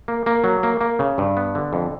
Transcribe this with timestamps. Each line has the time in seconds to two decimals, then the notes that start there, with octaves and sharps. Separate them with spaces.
0.08 A#3
0.26 A#3
0.44 F#3
0.63 A#3
0.81 A#3
0.99 C#3
1.18 G2
1.37 B3
1.55 D3
1.73 F2